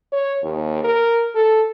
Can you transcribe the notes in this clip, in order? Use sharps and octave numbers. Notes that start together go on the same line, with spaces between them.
C#5
D#2
A#4
A4